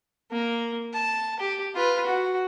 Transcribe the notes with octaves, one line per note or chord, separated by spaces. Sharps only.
A#3
A5
G4
F4 B4
F#4